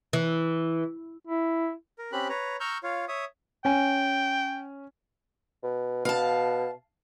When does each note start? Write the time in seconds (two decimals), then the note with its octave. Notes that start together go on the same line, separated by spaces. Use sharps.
0.13 E3
1.27 E4
1.98 A#4
2.12 C4 C#4 G4 B5 F#6
2.29 B4 C#5 A#5
2.60 A#5 C#6 E6 F6 G6
2.83 F4 C#5 F5
3.08 C#5 E5 D#6
3.65 C#4 G5 G#5
5.63 B2
6.05 B2 F5 A5